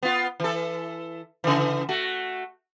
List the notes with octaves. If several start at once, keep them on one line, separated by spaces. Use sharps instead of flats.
B3 F4
E3 A4
C#3 E3
A3 F#4